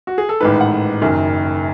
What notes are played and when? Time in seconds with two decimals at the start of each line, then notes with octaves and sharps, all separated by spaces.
0.07 F#4
0.18 G#4
0.29 A4
0.41 A1 G#2 D#3 B4
0.61 F#5
1.01 F#1 F#2 D#3